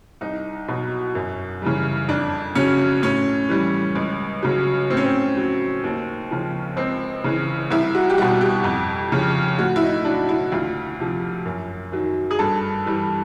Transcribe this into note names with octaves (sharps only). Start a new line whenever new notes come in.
C2 D#4
B2 F#3
F#2
C#3 E3 G3
F2 D4
C#3 F#3 C#4
A2 C#4
E3 G3
C#2
C#3 F#3
A2 C4
C#4
C4
F#3
D#2
C#3 F3
C#2 C4
C#3 E3
C2 E4
F#4
G4
B2 G3 F#4
G4
F2
C#3 F3
A2 F#4
E4
D#4
F#3 D4
E4
D2 F4
C3 F3
F#2
D#3 F#3
G#4
G2 A4
E3 G3